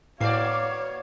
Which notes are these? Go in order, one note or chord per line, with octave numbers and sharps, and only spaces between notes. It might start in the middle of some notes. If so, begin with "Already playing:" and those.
A2 A#3 F#4 C#5 D5 F5 C7